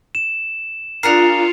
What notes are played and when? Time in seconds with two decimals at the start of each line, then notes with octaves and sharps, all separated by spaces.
0.15 E7
1.03 D4 F4 G#4 A#4 C7 C#7 F7